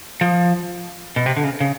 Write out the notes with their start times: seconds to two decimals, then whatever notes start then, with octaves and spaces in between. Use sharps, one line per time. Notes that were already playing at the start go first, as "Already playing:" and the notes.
0.21 F3
1.16 B2
1.26 C3
1.37 D3
1.44 C#3
1.60 C#3